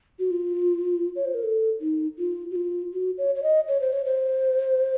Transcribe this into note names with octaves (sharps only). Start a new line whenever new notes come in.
F#4
F4
C#5
C5
A#4
A4
D#4
F4
F#4
F4
F#4
C#5
C#5
D#5
C#5
C5
C#5
C5